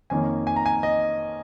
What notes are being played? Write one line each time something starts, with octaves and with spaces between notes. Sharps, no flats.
F2 D#3 A#3 C#4 G#5
G#5
A#5
G#5
D#5